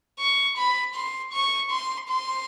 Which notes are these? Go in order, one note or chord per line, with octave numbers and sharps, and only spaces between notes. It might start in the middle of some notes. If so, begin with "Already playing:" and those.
C#6
B5
C6
C#6
C6
C6